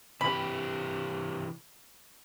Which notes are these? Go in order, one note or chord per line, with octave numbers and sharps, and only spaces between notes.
C3 E3 G4 B5